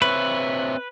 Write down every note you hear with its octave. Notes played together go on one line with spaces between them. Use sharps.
C4 B4 C#5 E5